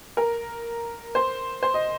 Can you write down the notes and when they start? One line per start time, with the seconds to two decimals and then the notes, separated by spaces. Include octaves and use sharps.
0.17 A#4
1.15 C5
1.63 C5
1.74 D#5